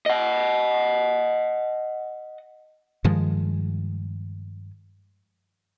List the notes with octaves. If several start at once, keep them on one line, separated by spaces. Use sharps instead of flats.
D#5 F#5
G2 D#3 F3 G#3